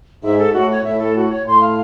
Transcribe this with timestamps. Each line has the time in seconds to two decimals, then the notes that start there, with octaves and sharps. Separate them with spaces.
0.23 G#2 E5
0.37 A4
0.53 A2 F#4
0.69 C#5
0.84 A2 E5
0.99 A4
1.15 F#4
1.30 C#5
1.46 A2 C6
1.60 F5